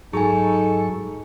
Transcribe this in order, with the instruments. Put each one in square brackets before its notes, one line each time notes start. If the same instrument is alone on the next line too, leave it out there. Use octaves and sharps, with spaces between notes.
[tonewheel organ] G#2 F#3 C#6 [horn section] D#4 A4 [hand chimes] G#4 G#5